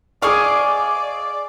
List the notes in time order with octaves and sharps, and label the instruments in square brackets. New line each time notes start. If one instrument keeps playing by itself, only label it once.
[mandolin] G#4 D#5 F5 [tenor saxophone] D5 [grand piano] C#6 D6